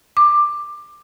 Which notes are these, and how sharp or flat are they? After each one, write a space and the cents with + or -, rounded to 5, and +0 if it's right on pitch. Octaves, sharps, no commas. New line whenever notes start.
D6 +15